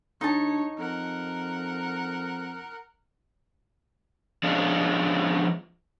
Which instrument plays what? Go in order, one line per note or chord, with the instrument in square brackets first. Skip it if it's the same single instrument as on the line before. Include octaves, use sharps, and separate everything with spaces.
[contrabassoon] D2 [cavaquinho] D#4 A5 [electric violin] C#5
[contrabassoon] F2 [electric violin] A#4 F#5
[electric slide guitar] F3 G#3 B3 C#4 D4 F4